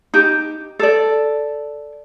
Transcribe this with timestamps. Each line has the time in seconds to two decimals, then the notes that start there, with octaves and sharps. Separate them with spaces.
0.14 D#4 G4
0.79 A4 D5